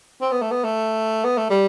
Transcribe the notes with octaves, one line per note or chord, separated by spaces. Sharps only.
C4
B3
A3
B3
A3
B3
A3
G3